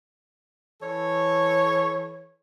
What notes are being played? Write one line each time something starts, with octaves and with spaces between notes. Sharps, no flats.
E3 A4 C#5